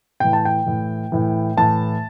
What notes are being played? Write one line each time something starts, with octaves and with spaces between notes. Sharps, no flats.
A2 E3 G5
A5
G5
A2 E3
A2 E3
A2 E3 A5